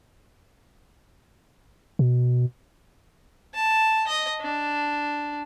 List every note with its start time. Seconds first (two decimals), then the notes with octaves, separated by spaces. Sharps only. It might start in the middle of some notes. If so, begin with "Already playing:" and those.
1.99 B2
3.55 A5
4.07 D#5
4.41 D4